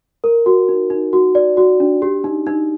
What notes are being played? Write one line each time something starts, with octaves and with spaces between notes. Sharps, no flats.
A#4
F#4
D#4
D#4
F#4
D5
F#4
D4
G4
D#4
D#4